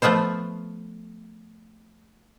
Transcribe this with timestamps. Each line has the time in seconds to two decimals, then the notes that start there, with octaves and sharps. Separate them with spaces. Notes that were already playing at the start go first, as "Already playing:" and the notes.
0.02 F3 A3 B3 F4 C5